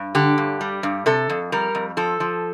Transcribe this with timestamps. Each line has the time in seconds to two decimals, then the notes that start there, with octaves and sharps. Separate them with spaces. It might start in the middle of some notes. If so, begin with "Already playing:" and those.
Already playing: G2
0.15 D3 G4
0.38 G2
0.61 G3
0.83 G2
1.06 C3 A4
1.30 F2
1.52 G3 A#4
1.75 F2
1.97 F3 A4
2.20 F3